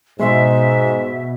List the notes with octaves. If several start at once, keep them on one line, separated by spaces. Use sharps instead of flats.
G#2 B2 G#3 E5 C6